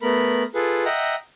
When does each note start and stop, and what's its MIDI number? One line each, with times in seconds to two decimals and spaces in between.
0.02 0.43 57
0.02 0.43 59
0.02 0.43 70
0.02 0.43 83
0.55 0.84 65
0.55 0.84 68
0.55 0.84 69
0.55 0.84 71
0.85 1.15 75
0.85 1.15 76
0.85 1.15 78
0.85 1.15 79
0.85 1.15 82